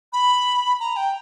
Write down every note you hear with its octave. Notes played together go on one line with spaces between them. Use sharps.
B5
A#5
G5